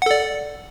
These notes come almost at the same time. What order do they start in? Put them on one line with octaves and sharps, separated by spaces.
F#5 A4 D5